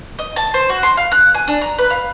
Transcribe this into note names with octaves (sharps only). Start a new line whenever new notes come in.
D#5
A5
C5
F#4
C6
F5
F#6
G#5
D4
A#5
B4
F5